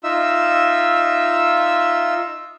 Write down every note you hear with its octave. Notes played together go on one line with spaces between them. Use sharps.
D#4 F4 E5 E6